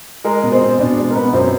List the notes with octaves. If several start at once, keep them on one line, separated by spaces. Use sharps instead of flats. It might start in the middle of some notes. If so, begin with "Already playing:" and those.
G#3 A#4
B2
C4 C5
B2
B2 D4 D5
G#3
A#4
B2 B3 B4
F#2 C4 C5